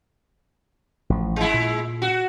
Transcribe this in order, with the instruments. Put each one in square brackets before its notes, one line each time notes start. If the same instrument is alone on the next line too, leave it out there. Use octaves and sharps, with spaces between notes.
[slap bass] A1 F3
[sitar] G#3 E4
[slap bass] A#2
[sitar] F#4